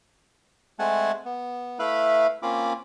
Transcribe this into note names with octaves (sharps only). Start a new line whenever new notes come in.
G#3 A3 C4 F#5 G#5 A5
B3
A3 E4 B4 E5 F5 B5
A#3 C4 C#4 F4 B5 D6